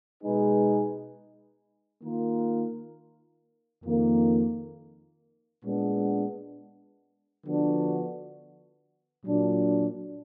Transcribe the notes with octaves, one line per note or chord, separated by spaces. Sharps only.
B2 G#3 D#4 G#4 B4
D#3 A#3 F4 A#4
F2 D#3 A#3
A#2 G#3 B3 D4
D3 F3 B3 D4 F#4
A#2 F#3 D4 F#4